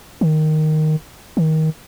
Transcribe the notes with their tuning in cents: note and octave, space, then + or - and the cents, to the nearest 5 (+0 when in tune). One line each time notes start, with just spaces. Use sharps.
D#3 -5
D#3 +20